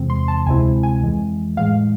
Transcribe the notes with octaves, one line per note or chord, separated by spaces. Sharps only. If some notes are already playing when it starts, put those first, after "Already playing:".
Already playing: E2 C3 E3 G#3 C4
C6
A5
D2 C3 G#3 C4 E4 G#5
G#5
F2 E3 G#3
A2 E3 G#3 F5